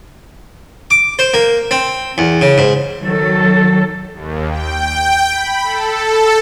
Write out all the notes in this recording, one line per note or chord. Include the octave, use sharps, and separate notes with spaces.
D6
C5
A#3
C4
E2
C#3
G#2
D#3 F#3 A4
D#2
G5
B5
A4